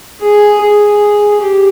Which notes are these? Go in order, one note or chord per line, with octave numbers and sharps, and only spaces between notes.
G#4
G#4
G4